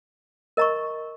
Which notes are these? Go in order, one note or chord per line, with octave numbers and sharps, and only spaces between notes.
A#4 D#5 A#5 C#6